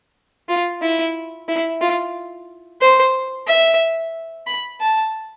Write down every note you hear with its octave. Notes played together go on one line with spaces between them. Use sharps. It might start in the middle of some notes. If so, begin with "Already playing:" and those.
F4
E4
E4
F4
C5
E5
B5
A5